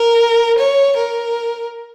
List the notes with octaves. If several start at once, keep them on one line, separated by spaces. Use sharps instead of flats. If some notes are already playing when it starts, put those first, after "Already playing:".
Already playing: A#4
C#5
A#4